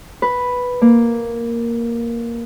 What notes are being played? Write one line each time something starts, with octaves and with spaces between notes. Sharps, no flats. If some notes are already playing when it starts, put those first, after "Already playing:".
B4
A#3